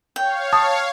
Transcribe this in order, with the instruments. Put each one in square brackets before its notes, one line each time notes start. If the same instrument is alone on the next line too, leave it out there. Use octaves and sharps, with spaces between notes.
[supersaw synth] C#5 F5 [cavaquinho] G5
[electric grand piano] A5 [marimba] D#6